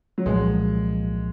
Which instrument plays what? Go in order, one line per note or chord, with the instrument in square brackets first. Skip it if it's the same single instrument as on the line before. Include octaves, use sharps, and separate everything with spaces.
[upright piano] F#3
[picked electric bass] C2 A#2 F3 [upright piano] G#3